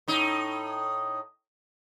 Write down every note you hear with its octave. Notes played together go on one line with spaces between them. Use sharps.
A2 D#4